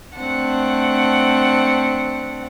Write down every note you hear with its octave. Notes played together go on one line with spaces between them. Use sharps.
A3 C4 D4 F#5